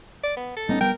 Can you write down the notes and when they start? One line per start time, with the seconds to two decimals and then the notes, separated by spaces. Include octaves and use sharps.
0.24 D5
0.37 B3
0.57 A4
0.69 G3 B3 C#4 D#4
0.81 G3 G#3 B3 A#4 G5